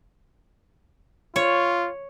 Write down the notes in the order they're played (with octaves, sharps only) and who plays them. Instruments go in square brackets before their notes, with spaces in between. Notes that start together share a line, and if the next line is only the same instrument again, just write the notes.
[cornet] F4 [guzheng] C#5